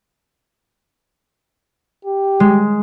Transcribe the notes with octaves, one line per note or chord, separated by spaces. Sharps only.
G4
G#3